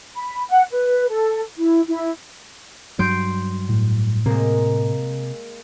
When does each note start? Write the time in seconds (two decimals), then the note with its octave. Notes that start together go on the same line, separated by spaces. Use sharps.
0.15 B5
0.49 F#5
0.71 B4
1.09 A4
1.57 E4
1.87 E4
2.99 G2 F#3 C6 G6 D7
3.69 A2
4.26 C3 G#3 A#3